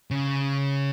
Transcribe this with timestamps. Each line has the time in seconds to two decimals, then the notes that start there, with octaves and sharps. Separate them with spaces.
0.11 C#3